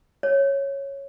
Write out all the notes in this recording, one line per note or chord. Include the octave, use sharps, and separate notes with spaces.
C#5